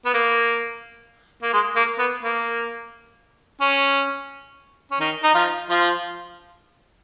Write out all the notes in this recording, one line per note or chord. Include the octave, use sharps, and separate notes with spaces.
B3
A#3
A#3
G#3
A#3
B3
A#3
C#4
C#4
D#3 D#4
D#4
F3 F4
F3 F4